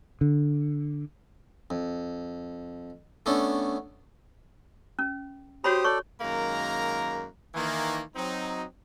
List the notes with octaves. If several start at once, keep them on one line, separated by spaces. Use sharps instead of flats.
D3
F2
A3 B3 C#4 D4 A4
C#4
F#4 G4 C5 C#5 B5 D#6
A4 C#5 D5 C#6
F#2 D#3 G#3 A#3 A#4 A#5
D#3 E3 A#3
F#3 C4 D#4